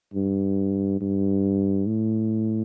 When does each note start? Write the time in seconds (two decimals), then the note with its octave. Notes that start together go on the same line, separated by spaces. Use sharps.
0.14 G2
1.01 G2
1.86 A2